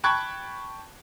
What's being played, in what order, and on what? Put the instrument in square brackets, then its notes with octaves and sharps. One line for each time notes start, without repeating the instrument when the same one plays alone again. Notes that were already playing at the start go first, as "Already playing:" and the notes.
[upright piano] G5 A5 B5 C#6 F#6 G#6